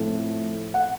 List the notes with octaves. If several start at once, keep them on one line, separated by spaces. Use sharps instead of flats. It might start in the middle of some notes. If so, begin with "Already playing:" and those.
Already playing: A2 F3 A3 C4
F#5